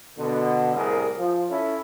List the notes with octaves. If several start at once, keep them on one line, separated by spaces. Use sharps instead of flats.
B2 D3
C2 A2 G3 G#4 A#4
F3
C#4 E4 A4